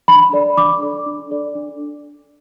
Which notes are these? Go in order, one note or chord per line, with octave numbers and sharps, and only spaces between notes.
D4 B5
A4 D5
D4 D6
A4 D5
D4
A4 D5
D4